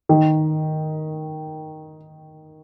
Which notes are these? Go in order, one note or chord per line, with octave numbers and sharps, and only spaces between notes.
D#3